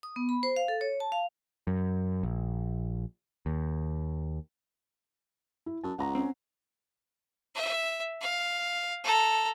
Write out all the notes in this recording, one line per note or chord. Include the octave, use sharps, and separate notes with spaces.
D#6
B3
B5
C5
F5
A4
C#5
A5
F5
F#2
A#1
D#2
E4
F#2 A5
C#2 F#5 A#5
C4 C#4
E5
F5
A4 A#5